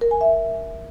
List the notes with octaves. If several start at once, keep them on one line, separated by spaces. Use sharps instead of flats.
A#4
G#5
E5